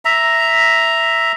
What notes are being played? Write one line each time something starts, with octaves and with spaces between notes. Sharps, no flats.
E5 A#5